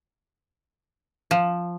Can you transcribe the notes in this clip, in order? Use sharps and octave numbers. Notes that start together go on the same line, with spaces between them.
F3